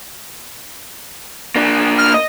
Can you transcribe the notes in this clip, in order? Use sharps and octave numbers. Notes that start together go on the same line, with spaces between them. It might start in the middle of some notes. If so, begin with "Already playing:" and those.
A#3 D4
F6
D#5